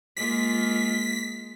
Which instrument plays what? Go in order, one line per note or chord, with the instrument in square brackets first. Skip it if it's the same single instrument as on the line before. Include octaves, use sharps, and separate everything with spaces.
[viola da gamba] G#3 A#3 F4 [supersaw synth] B6